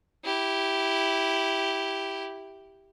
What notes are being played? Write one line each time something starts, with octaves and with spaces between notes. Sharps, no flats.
E4 G4